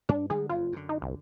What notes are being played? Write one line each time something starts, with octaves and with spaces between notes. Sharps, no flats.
G2 D4
D3 G3 G#3 G#4
F#1 F2 F4
F#2 D3
D#4
C2